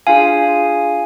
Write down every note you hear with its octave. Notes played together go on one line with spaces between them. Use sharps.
D4 F4 G#4 F5 G#5